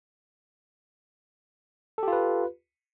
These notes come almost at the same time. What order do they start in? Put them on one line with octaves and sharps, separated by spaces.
A4 G4 F4 B4